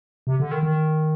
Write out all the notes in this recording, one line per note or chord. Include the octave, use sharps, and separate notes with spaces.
C3
D3
D#3
D#3